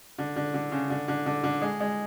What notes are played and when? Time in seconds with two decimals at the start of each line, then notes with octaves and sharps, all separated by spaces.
0.19 D3
0.36 D3
0.54 D3
0.72 C#3
0.90 D3
1.08 D3
1.26 D3
1.44 D3
1.62 G#3
1.80 G#3